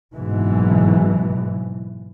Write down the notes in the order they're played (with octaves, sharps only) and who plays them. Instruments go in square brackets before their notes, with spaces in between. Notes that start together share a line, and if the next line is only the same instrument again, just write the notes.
[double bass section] F#1 G#2 B2 E3